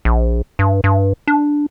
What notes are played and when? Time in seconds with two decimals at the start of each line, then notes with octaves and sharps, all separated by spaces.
0.05 A#1
0.59 G2
0.84 G2
1.27 D4